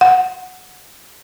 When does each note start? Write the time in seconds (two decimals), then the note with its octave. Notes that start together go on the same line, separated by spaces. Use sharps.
0.01 F#5